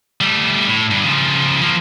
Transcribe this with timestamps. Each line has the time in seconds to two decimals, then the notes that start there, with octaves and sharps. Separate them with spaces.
0.21 G3 A3
0.68 A2
0.91 G2 D3
1.04 C#3 F3
1.61 F3 A#3